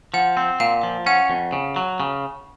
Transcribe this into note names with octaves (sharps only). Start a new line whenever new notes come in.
F3 F#5
C4
A#2 F5
F3
C#4 F#5
F2
C#3
F#3
C#3